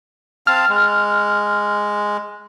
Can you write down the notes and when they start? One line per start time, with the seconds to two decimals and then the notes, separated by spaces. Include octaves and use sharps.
0.47 C4 F5 A5 F6
0.69 G#3